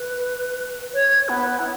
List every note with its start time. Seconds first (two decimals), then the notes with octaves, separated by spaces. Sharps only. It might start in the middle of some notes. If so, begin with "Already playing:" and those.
Already playing: B4
0.94 C#5
1.29 B3
1.59 E4